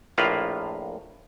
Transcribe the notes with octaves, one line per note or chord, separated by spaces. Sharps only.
A#1 A2 A#3 F4 B4 F5